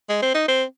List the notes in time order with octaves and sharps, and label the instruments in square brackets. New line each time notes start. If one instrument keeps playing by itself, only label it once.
[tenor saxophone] G#3
C4
D#4
C4